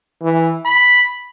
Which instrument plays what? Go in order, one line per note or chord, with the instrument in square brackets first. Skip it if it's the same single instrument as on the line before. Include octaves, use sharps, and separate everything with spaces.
[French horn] E3
[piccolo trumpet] B5